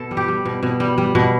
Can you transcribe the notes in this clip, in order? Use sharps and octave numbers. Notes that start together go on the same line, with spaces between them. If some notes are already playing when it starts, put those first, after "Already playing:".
Already playing: B2 A4
G3
G4
G3
B2
B2
G3
G3
B2